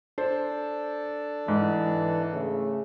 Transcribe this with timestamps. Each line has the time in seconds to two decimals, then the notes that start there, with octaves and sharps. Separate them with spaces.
0.18 D4 A4 C5
1.48 G#2 E3
2.33 C#3 A3